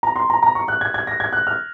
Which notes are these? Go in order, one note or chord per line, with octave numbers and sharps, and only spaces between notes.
A#5
C6
A#5
A#5
C#6
F#6
G#6
G#6
A#6
G#6
F#6
F6